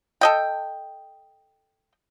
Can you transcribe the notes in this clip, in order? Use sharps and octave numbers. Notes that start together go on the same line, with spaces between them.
A4 D#5 G5